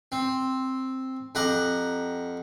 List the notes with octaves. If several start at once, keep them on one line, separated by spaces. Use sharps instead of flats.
C4
F2 G4 F#5 A#5